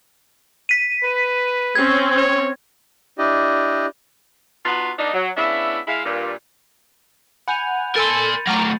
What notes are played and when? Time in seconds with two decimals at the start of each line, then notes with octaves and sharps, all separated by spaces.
0.69 B6 D#7
1.03 B4
1.75 C4 C#4 G#6
2.17 C#5
3.18 D4 E4 G4 D5 D#5
4.66 B3 D4 D#4 F4 F#4 B4
4.98 A#2 F3 A#3 D4 D#4
5.14 F#3
5.37 C#3 B3 D4 E4 E5
5.88 G#3 E4 F5
6.06 G2 A#2
7.48 F#5 G#5 B5 G6 F7
7.96 A4 A#4 G#5 C6 E6 A6 C#7 D#7
8.47 F#3 A3 A#5 D6 F6